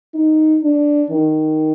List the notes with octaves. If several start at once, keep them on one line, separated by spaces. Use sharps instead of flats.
D#4
D4
D#3